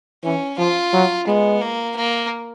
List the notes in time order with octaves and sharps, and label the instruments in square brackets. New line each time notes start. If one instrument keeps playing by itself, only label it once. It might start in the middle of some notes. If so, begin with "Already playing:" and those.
[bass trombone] E3 [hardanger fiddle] C#4
[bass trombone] F3 [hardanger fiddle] F4
[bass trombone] F#3
[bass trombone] G#3 [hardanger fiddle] B3
[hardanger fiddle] A#3
A#3